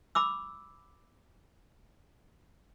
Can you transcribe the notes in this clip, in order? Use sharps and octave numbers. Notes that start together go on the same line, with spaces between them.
B5 D6 E6